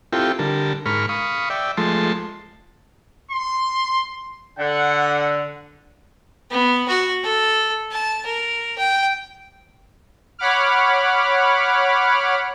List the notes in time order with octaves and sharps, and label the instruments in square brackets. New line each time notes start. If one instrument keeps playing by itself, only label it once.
[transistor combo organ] C4 E4 F4 G4 A4 G5
D3 G3 A#4 A5
G#2 A#4 B5 C#6 F6
F5 B5 C#6 D#6
D5 E5 G5
F3 G#3 A3 A5 C6
[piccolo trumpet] C6
[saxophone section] D3 [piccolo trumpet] F#5
[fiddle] B3
F#4
A4
A5
A#4
G5
[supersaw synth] C#5 F#5 B5 D6 F6